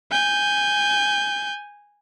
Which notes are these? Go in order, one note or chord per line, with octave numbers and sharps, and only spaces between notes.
G#5 G6